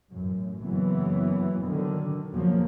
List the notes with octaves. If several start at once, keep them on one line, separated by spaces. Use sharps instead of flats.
A1 F#2
F#1 E3 F#3 B3
D3 D#3 F#3
E2 C#3 F3 F#3 A#3